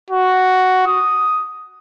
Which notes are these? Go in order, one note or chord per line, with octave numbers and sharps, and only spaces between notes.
F#4
D#6